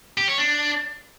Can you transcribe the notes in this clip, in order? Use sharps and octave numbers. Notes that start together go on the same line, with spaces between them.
G4
C#5
D4